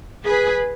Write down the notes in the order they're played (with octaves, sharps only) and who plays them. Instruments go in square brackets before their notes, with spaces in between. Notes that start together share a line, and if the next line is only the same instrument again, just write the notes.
[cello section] G#4 B4